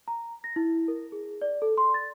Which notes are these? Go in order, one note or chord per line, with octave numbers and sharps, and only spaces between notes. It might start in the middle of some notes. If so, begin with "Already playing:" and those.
A#5
A#6
E4
A#4
G#4
D5
A4
C6
A6